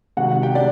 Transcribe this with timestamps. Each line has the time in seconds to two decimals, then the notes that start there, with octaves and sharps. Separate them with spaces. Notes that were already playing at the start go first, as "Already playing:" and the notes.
0.17 C3 D#3 G#3 F#4 F#5
0.42 G4 G5
0.55 G#3 D4 D5